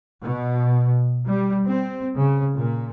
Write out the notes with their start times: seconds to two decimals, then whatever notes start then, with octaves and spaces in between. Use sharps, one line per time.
0.24 B2
1.26 G3
1.65 C4
2.17 C#3
2.56 A#2